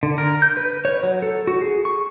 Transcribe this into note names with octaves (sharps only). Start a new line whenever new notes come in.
D3
A#4
G6
B4
C#5
F#3
A4
F#4
G#4
C#6